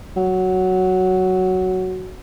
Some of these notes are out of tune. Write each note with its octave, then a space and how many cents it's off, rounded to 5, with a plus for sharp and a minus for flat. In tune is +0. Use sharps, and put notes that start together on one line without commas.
F#3 +5